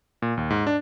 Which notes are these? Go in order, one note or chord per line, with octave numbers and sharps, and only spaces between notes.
A#2
D#2
G#2
D4